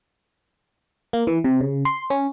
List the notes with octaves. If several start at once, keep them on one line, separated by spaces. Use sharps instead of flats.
A#3
E3
C3
C#3
C6
C#4